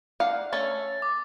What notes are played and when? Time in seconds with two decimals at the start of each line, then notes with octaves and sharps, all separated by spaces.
0.20 D4 F5 F#5
0.53 A3 C#4 A4 A6
1.02 D6